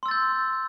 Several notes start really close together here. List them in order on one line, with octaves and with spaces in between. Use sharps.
C6 E6 A6 G6